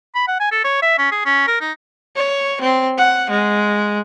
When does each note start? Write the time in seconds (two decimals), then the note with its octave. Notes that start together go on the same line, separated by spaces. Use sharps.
0.15 B5
0.28 F#5
0.40 G#5
0.52 A4
0.64 C#5
0.82 E5
0.98 C#4
1.12 G#4
1.26 C#4
1.47 A#4
1.61 D#4
2.16 C#5
2.62 C4
2.98 F#5
3.30 G#3